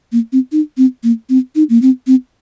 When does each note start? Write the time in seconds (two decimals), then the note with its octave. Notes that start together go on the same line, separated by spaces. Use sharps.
0.12 A#3
0.32 C4
0.52 D#4
0.78 C4
1.03 A#3
1.29 C4
1.55 D#4
1.70 A#3
1.82 C4
2.07 C4